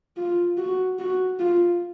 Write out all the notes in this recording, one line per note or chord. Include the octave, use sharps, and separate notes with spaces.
F4
F#4
F#4
F4